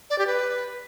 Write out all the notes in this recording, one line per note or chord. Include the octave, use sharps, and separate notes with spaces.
D5
G4
B4